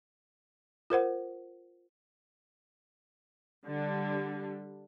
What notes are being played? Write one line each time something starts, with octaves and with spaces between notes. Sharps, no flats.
F4 A#4 C5 F#5
D3 G3